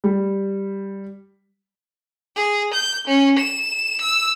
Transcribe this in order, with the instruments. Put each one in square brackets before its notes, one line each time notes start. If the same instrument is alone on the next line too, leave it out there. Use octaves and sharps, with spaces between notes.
[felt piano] G3
[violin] G#4
G6
C#4
E7
E6